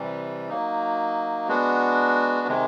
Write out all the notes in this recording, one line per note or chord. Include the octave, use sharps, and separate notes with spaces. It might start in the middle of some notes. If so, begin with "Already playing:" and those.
Already playing: C3 E3 G3
F#3 A#3 D#4
G#3 B3 D4 F#4
C3 D#3 G#3